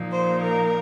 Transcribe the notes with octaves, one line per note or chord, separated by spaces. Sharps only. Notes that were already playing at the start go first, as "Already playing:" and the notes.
Already playing: A#2 F3 A#3 D#4
C5
A#4